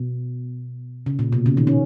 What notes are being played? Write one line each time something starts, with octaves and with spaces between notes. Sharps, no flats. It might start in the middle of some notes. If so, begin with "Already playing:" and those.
Already playing: B2
C#3
A#2
B2
C#3
D#3
C#4